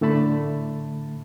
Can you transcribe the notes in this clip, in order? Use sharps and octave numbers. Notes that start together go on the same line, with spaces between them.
A2 D3 A3 A5 B5